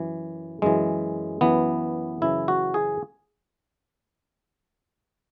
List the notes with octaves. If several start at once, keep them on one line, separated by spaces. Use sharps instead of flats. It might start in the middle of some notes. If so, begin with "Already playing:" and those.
Already playing: F#2 E3
F#2 E3 G#3
F#2 E3 B3
F#2 C#3 E3 E4
F#4
G#4